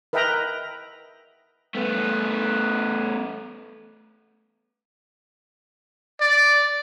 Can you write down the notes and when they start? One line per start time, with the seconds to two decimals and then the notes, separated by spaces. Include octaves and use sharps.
0.13 A#4 B4 D#5 E5 G5 A#5
1.75 A3 B3
6.21 D5